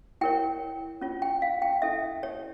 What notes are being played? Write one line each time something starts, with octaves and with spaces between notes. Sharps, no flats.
E4 A#4 C#5 G5
C#4 F4 C#5
G5
F5
G5
C#4 E4 A4 E5
C#5